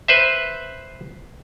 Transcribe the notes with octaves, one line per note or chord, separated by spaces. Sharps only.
B4 C5 E5